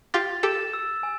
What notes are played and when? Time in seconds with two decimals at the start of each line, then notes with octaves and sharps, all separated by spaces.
0.14 F4 G4 A6
0.43 G4 A4 E7
0.73 E6
1.03 G#5